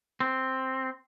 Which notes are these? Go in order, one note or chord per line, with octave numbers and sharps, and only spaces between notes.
C4